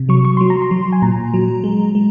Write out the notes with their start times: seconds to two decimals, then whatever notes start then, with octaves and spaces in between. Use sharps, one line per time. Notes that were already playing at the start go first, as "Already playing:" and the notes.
Already playing: C3
0.09 F#3 C#6
0.25 C#6
0.37 F#3 C6
0.50 A#5
0.62 C6
0.71 F#3
0.92 G#5
1.02 A#2 A#5
1.34 F#3
1.64 G#3
1.95 G#3